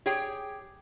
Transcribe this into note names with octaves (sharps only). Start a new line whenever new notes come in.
G4 G#4 C#5 G5